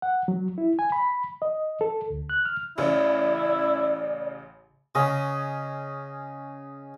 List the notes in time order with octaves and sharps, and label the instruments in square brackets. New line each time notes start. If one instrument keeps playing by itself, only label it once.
[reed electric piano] F#5
F#3
E4
G#5
B5
D#5
A4
D2
F#6
F6
[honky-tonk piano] A1 C#3 [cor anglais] E4 [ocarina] D5
[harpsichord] C#3 [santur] C#4 G#4 D#5